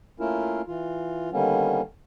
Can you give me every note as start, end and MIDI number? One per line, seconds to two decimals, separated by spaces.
0.20 0.62 57
0.20 0.62 58
0.20 0.62 61
0.20 0.62 64
0.20 0.62 65
0.20 0.62 70
0.67 1.30 52
0.67 1.30 65
1.32 1.81 50
1.32 1.81 51
1.32 1.81 55
1.32 1.81 58
1.32 1.81 59
1.32 1.81 61